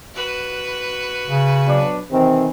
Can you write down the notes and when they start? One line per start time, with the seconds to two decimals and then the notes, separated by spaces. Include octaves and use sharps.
0.14 F#4 B4
1.27 C#3
1.67 B2 F#3 D4
2.11 C3 D#3 E3 C4